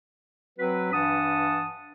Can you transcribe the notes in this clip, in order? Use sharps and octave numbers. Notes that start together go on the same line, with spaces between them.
F#3 C4 F#4 B4
G2 E3 D4 F#5 A5 D#6